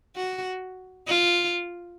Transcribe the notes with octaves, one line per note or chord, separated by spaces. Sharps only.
F#4
F4